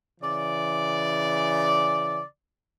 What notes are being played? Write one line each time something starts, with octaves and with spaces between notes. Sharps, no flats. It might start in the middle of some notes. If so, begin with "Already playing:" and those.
C#3 E3 D5